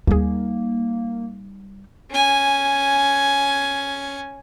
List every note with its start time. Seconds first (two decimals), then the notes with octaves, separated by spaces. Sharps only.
0.07 D#2 G3 A#3 D#4 G#4
2.10 C#4 G#5